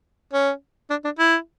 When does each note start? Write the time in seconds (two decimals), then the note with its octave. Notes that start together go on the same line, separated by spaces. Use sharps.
0.33 C#4
0.90 D4
1.05 D4
1.19 E4